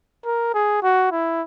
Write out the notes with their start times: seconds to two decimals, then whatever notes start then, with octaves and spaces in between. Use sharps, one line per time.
0.25 A#4
0.54 G#4
0.82 F#4
1.12 E4